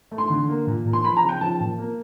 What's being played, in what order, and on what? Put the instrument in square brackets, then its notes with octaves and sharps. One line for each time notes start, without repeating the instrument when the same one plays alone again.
[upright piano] A3
C6
D3
A#3
A#2
A#2
C6
F3 B5
A#5
C#3
G5
F3 A5
A#2
A#3